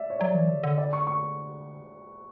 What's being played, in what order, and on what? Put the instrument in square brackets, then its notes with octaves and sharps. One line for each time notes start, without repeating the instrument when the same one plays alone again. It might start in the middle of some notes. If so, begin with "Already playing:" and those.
Already playing: [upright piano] D5 E5
C#5
[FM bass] F#3 [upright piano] D5
[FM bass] E3
D3
D3
[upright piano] D5
C#6
C#6